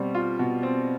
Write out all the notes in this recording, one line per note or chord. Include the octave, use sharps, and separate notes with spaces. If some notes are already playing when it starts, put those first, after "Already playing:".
Already playing: B2 G3 C4
F4
B2
C4